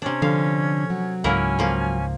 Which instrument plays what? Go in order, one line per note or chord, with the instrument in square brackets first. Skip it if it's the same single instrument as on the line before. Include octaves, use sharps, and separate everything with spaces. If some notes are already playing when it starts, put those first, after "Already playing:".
[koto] C3 D4 [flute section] C#4 G#6
[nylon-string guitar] D3 [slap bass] F3 [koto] F5
[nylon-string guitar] F#3
[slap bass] C#2 G#2 [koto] A#3 E4 A#4 [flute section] C#4 G#5
[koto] F3 A#3